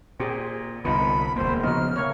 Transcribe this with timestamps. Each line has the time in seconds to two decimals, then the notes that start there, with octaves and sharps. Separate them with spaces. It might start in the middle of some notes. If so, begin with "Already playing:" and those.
0.20 A#2 C4 G4 G#4
0.85 C2 D3 B3 D#4 F4 B5
1.36 E1 D2 A#3 C5
1.63 C#3 F3 B3 D#4 F#4 F6
1.96 A3 A#3 C#5